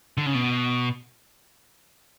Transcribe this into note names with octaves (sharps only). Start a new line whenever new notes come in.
D3
C#3
B2